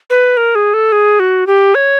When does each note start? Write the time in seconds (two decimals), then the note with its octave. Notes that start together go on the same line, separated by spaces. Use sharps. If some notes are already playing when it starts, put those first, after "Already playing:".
0.10 B4
0.37 A#4
0.55 G#4
0.74 A4
0.92 G#4
1.19 F#4
1.47 G4
1.75 C#5